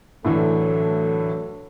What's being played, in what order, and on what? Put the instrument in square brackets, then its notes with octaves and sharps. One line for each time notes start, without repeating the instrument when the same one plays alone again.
[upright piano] A2 D3 E3 [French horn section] F#3 A3 A4